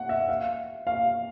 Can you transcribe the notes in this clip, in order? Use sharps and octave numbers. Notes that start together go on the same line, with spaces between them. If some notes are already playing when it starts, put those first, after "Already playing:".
Already playing: F#5
E5
F5
F5